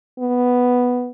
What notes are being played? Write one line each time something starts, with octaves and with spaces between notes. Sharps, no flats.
B3